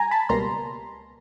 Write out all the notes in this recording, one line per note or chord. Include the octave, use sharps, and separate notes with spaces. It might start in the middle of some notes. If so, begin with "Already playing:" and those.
Already playing: G3 G#5 A#5
A5 B5
C#2 B2 G3 A#3 A#5 C6